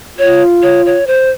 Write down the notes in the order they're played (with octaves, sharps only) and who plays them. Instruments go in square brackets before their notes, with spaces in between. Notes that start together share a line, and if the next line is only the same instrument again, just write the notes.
[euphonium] F4 [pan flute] C#5
[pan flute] C#5
C#5
C5